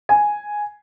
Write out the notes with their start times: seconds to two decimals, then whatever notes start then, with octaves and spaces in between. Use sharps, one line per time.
0.09 G#5